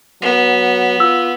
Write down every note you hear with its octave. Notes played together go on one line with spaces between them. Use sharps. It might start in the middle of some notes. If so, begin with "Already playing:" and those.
F#3 B3
F4 E6